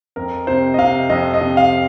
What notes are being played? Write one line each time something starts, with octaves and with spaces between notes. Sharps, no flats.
F2 A#4
C3 C5
D#5
C3 F5
F2 D#5
D#5
C3
F5